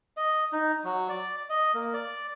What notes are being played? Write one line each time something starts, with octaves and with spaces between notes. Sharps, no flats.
D#5
D#4
F#3
D5
D#5
A#3
D5